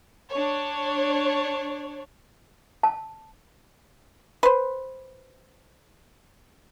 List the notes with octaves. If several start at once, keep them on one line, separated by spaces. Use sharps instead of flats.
D4 C#5
A5
B4 C5